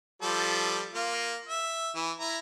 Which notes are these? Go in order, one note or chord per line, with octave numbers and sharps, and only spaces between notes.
F3 G3 A4
A#3 F4
E5
E3
E4 A#5